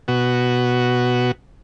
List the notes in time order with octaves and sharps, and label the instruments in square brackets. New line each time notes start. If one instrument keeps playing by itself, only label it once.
[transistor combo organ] B2 F#4